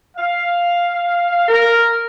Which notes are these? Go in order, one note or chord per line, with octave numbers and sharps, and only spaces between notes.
F5
A#4